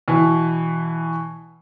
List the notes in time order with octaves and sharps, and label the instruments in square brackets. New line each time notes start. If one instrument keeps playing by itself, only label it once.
[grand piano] B2 E3